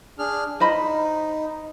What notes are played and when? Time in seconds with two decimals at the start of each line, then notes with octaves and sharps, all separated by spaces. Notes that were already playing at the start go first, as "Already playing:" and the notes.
0.19 D4 G#4 F6
0.60 D#4 C5 D#5 B5